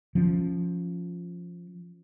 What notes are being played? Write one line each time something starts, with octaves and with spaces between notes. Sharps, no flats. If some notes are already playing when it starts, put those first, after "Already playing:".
F3 C#4